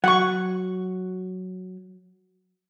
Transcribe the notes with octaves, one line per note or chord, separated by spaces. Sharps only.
F#3 F#5 C#6